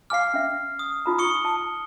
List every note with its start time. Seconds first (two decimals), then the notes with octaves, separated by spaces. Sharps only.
0.10 F5 G#5 D6 F6 C7
0.34 C#4 E5
0.79 D#6
1.06 D#4 F4 A#5
1.18 C#6 D#6 C#7 G7
1.45 A5